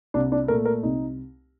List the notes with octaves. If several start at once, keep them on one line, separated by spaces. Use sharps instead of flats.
C2 D4
D4
A#2 A3 A#4
A#4
C2 D#4